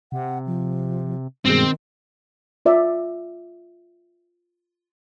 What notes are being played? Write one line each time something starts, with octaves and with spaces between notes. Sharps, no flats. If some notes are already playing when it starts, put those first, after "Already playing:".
C3 F#5
F3
G2 B2 D#3 G#3 C4
F4 D5 E5